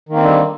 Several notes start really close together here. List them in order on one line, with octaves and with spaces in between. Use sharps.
D#3 A#3 C4 D3 G3